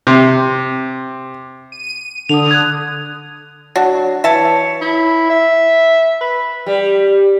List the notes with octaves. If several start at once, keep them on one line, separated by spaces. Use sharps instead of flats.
C3
D#7
D3 D#6 F7
F#6 G#6
F#3 D4 F#4
E3 C#5 E5 A5
E4
E5
B4
G3